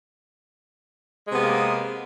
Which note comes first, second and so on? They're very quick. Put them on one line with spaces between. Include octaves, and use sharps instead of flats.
G#3 C3 B3 A#3